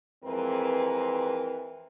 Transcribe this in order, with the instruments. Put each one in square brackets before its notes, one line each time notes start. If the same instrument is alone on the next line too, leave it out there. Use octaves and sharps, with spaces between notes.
[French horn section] F2 E3 G#3 C4 A#4 B4